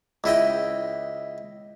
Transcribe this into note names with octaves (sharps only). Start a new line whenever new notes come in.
C#2 E4 D#5 G5